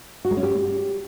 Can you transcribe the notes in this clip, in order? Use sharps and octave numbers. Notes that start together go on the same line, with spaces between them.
F#4
G#3
C#4
G4